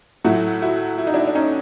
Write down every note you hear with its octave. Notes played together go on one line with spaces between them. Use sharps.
A2 F#3 A3 E4 F#4
E4 F#4
E4
D#4
D4 E4
D4
C#4 D#4